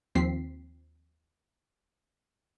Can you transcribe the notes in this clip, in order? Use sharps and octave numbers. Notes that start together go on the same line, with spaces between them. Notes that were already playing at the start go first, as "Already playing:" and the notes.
D#2 F3 C4 B6 C7